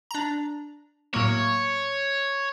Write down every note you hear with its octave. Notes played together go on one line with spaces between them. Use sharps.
D4 A#5
A2 F#3 A#3 C#5